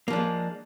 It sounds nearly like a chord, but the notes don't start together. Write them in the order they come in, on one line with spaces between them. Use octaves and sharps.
A#3 F3 D4 G#3